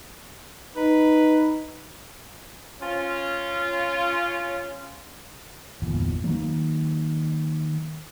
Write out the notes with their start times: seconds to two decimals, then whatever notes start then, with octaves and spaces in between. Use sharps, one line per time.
0.76 D#4 B4
2.81 C#4 F4
5.82 G1 E2 A#2
6.24 D#3 E3 F#3 A#3